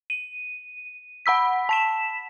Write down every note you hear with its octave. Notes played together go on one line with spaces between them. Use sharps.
D#7
F#5 B5 E6 B6
A5 B6 E7